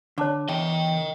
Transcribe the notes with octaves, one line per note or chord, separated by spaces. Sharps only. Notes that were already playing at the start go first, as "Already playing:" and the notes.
D3 C#5 A5 D6
E2 D#5 G5